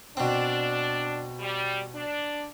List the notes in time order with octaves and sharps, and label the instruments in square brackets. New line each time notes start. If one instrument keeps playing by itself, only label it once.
[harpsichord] B2 C4 [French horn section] D4
[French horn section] G3
D4